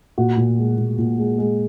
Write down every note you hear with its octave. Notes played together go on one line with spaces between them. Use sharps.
A#2 F#4
A#2
G#3
A#2
A#2
G#3
G#3